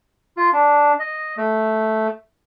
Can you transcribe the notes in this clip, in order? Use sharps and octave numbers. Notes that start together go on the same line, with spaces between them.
F4
D4
D#5
A3